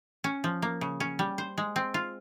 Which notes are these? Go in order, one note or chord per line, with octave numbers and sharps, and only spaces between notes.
C#4
F3
A#3
C#3
C#4
G3
C5
G#3
C4
F4